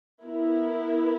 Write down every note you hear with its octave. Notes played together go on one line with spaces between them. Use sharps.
B3 E4 A#4